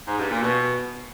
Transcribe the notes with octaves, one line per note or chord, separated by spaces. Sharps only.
G#2
G2
A#2
B2